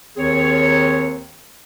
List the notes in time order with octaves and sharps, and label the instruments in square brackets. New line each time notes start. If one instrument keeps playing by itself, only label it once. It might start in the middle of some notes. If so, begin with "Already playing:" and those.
[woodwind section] D#2 D#3 C4 G#4 C#5